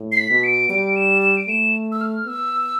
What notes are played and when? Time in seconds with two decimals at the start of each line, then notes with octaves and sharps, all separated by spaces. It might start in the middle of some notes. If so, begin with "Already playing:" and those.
Already playing: A2
0.12 C7
0.17 B6
0.30 B2
0.44 D7
0.69 G3 D7
0.96 E7
1.22 E7
1.37 D7
1.48 A3 E7
1.92 E6
2.01 F6
2.27 B3 E6